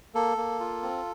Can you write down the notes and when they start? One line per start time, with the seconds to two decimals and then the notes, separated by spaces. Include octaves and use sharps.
0.15 A#3 A4
0.37 A#3
0.60 F4
0.83 C4